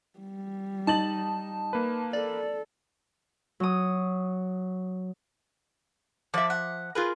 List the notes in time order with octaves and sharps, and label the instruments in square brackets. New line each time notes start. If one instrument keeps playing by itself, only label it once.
[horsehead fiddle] G3
[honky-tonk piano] D#4 A6 F#7 [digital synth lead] A5
[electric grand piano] A#3 B4
[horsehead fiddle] A4 [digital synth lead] D5
[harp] F#3 D#6
[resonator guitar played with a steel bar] F3 E5 [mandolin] D5
[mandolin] F#5
[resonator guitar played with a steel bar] F4 G#4 A#4 [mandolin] B4